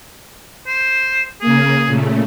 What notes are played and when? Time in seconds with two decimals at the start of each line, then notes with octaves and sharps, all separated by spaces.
0.67 C5
1.41 C#3 A#3 G#4
1.87 A#2 C#3 A3